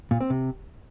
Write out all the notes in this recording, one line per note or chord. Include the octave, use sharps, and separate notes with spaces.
A#2
C4
C3